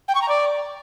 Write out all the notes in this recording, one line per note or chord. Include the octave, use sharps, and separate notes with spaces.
G5
C#6
A#5
D5